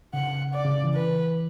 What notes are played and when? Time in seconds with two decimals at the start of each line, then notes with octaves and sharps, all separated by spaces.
0.13 C#3 F#5
0.54 D5
0.65 C#3
0.84 E3
0.95 B4